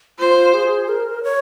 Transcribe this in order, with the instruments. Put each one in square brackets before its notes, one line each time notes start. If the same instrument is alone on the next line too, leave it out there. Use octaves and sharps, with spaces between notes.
[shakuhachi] F4 [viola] C5
[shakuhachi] G#4
A#4
C#5